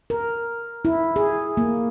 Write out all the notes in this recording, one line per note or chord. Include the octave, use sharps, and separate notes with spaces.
A#4
E4
G#4
A#3